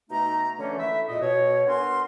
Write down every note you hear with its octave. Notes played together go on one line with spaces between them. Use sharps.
B2 A3 D#4 E5 A#5
D3 E3 A3 C#4
A3 E4 E5
E2 A#2 D#5
B2 C#5
B3 D4 A#4 G#5 C6